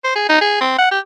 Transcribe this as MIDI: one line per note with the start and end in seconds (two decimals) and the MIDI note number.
0.04 0.15 72
0.16 0.26 68
0.29 0.37 63
0.41 0.60 68
0.61 0.75 60
0.79 0.89 78
0.91 0.99 67